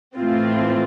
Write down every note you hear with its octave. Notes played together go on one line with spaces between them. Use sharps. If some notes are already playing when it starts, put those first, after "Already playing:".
A2 E3 A3 C4 F4